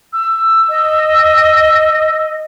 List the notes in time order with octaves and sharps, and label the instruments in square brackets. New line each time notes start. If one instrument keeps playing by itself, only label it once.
[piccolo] E6
[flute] D#5